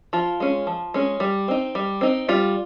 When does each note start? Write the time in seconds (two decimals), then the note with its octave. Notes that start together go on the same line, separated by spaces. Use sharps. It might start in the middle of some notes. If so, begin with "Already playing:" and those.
0.13 F3 F4
0.40 G#3 C#4
0.67 F3
0.94 G#3 C#4
1.20 G3
1.48 C4 D#4
1.75 G3
2.01 C4 D#4
2.28 G3 F4